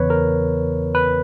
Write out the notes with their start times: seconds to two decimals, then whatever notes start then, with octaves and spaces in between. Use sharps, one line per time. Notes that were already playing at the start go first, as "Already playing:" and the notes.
Already playing: E2 C#3 E3 B3 B4 C#5
0.10 A#4
0.95 B4